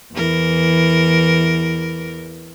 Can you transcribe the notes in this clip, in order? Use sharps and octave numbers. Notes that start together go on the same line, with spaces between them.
E2 E3 A#4